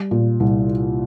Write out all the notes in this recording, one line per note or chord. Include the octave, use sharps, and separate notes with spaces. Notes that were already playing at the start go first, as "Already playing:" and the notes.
Already playing: G3
A#2
C2